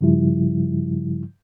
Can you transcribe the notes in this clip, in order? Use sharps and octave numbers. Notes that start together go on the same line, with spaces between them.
G2 C#3 F3 G3 E4